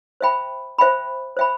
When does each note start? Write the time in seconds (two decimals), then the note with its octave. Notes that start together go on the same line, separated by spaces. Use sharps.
0.21 C5 E5 G5 B5
0.78 C5 E5 G5 B5
1.37 C5 E5 G5 B5